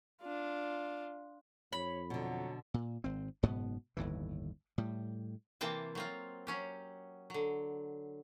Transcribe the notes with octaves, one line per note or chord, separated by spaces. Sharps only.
D4 F4
F2 C#5 B5
B2 D3 F#3
A#2
G#1 C4
F#1 G#2 B2 B3
G1 D#2 A2 E3
A2 G3
C3 E3 A#3 C4 G5 A5
F#3 C4 F4
F#3 C#4 G4
D3 F#3